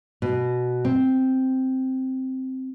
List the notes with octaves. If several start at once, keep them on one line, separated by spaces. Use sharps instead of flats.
B2
C4